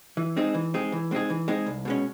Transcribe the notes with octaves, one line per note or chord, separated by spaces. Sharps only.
E3
G#3 C4 D#4 G#4
E3
G#3 C4 D#4 G#4
E3
G#3 C4 D#4 G#4
E3
G#3 C4 D#4 G#4
C2
B2 G#3 C#4